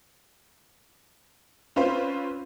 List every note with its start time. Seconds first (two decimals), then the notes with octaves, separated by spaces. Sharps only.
1.76 C4 C#4 F4 B4 C5 F5